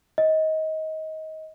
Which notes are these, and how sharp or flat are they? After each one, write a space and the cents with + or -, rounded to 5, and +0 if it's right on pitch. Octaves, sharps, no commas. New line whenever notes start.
D#5 +20